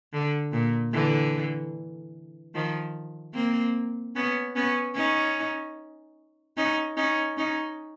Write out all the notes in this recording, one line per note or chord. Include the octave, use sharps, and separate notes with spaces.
D3
A#2
D3 E3
D#3 F3
A#3 C4
B3 C#4
B3 C#4
C#4 D#4
C#4 D#4
C#4 D#4
C#4 D#4